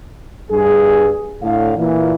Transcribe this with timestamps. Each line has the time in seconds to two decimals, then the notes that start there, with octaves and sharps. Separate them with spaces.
0.51 G2 G#4
1.43 A2 D3 F5
1.78 A#2 E3